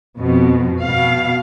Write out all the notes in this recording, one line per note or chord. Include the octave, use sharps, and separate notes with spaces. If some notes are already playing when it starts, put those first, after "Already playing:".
F2 B2
B2 F5